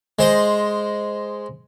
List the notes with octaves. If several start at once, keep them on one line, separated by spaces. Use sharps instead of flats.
G#3 C5 D#5